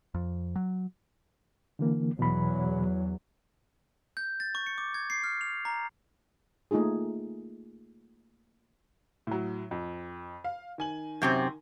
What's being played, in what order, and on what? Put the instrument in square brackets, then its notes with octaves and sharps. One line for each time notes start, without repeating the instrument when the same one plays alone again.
[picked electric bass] F2
F#3
[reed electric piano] D3 E3 A#3
[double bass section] E2 F#3 [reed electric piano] B2 E3 B5
[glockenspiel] G6
A6
C#6
C#7
D6
G#6
C7
F6
F7
A#5
[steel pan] A3 A#3 D#4 F4 G#4
[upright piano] A2 F#3
F2
F5
D#3 G#5 F#7
[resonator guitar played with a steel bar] F#2 C3 C4